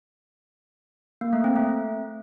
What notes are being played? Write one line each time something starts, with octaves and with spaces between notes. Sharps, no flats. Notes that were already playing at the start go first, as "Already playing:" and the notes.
A#3
A3
C4
A3